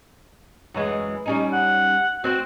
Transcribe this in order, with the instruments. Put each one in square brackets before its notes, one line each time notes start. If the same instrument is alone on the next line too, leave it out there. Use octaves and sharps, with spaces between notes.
[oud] F#2 E3 G#3
G3 C#4 D#4
[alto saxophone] F#5
[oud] C4 C5 [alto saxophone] F#4